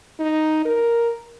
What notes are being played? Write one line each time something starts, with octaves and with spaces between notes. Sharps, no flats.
D#4
A#4